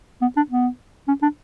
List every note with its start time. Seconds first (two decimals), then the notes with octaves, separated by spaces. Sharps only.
0.21 B3
0.36 D4
0.50 B3
1.08 C#4
1.22 D4